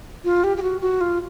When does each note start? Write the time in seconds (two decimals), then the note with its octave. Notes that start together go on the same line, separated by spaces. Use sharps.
0.24 F4
0.44 G4
0.57 G4
0.62 F#4
0.81 F#4
1.01 F4